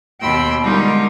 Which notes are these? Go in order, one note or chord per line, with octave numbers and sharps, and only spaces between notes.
D#2 B2 G5 B5 C6 E6
D3 G3 G#3 D#4 F4 A#4